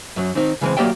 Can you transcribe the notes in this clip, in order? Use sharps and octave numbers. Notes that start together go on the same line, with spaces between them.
F#2 F#3
D#3 C4 D#4
C#3 E3 G3 G#3 C4
F#3 A#3 G4 D5 E5 G5